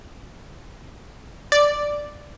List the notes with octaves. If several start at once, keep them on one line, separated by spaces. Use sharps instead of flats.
D5